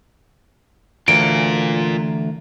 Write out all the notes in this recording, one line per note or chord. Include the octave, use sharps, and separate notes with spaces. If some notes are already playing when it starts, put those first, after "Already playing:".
D2 E3 F4 A#4 D7